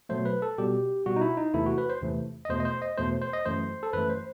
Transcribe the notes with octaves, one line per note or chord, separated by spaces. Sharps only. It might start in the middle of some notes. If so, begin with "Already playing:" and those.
B2 F#3 A3 C5
B4
A4
B2 G3 G4
B2 G3 F#4
D#4
E4
D#4
E2 C3 E3 A3 E4
F#4
B4
C5
E2 C3 E3 A3
D#5
E2 B2 A3 C5
D#5
C5
D#5
E2 B2 A3 C5
C5
D#5
F#2 E3 A3 C5
A4
F#2 E3 A3 B4
C5